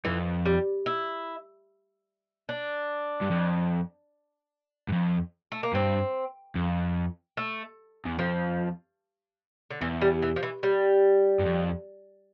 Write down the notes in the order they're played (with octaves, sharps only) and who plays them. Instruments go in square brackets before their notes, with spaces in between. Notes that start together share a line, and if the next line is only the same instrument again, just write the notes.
[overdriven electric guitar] F2 [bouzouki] E3
[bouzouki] G3
E4
D4
[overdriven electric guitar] G2
F2
G2
F2
[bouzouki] A3
A#3
[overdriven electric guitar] G2 [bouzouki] C4
[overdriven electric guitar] F2
[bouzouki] A3
[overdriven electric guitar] E2
[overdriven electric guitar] F2 [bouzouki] F3
[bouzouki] D3
[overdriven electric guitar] E2 [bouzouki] E3
[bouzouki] G3
E3
F3
E3
G3
[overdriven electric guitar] G2
F2